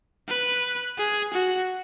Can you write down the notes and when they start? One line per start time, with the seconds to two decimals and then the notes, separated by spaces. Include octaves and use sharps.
0.28 B4
0.98 G#4
1.33 F#4